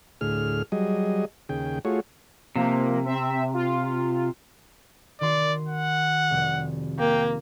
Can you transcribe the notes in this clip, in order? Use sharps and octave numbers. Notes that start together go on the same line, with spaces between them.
D2 A2 G#4 F6
F#3 G3 G#4 D#5
D#2 C#3 G#4 G5
A3 F4 F#4 G#4 C#5
C3 F3 A#3
C4 E5
F4
D#3 F#4 D5 C6
F#5
F1 G3
A#3 G5